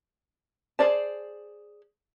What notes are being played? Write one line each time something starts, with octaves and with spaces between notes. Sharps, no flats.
G#4 B4 C5 D5 A5